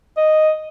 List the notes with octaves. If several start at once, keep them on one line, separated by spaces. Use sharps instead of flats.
D#5